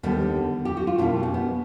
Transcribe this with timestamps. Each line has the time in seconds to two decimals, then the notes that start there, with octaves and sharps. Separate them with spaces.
0.03 D#2 D3 G3 B3
0.65 G4
0.77 F#4
0.87 F4
0.98 B2 G3 A#3 D4 E4
1.23 C#4 D#4
1.34 B3